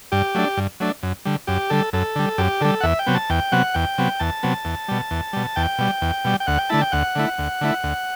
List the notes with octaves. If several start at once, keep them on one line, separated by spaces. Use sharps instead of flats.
G2 G4
F#3 A3 D4
G2
F#3 A3 D4
F#2
D3 G3
F#2 G4
D3 G3 A4
F#2 A4
D3 G3
F#2 G4
D3 G3 A4
F#5
E2 E5
G5
C3 F#3 B3
A5
E2 G5
C3 F#3 B3 F#5
E2 G5
C3 F#3 B3
E2 A5
C3 F#3 B3
E2
B2 G3
E2
B2 G3
E2 G5
B2 G3
E2
B2 G3
G5
D2 F#5
G5
D3 A3 E4 A5
G5
D2 F#5
D3 A3 E4
D2
D3 A3 E4
D2